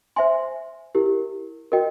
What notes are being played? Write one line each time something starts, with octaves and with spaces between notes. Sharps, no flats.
C5 E5 G#5 C6
E4 G4 A#4
F#4 A#4 D#5 G5